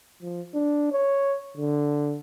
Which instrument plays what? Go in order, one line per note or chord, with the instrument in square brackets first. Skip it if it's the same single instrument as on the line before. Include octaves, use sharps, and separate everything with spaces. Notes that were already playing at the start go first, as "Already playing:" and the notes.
[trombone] F3
D4
C#5
D3